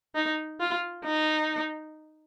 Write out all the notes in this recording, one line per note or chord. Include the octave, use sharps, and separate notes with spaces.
D#4
F4
D#4